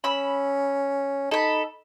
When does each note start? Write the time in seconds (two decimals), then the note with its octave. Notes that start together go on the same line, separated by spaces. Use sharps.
0.04 C#4 B5 E6
1.31 D#4 A4 B5